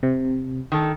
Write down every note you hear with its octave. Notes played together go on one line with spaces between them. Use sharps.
C3
D#3 A4